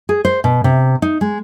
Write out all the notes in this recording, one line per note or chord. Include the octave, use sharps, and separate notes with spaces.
G#4
C5
B2
C3
D#4
G#3